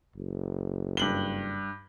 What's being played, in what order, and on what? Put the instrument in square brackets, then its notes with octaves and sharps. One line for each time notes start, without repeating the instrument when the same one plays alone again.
[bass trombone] F#1
[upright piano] G2 F#7 G7